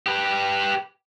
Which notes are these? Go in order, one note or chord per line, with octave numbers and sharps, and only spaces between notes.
G4 B4